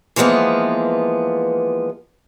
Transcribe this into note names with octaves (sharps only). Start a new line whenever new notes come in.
E3 F3 G#3 A#3 B3